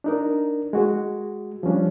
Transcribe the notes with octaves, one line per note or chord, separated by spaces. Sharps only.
D4 D#4 A#4
G#3 F#4
F3 G3 C#4 D4